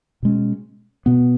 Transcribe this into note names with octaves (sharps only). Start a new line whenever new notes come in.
B2 G#3 C#4
B2 B3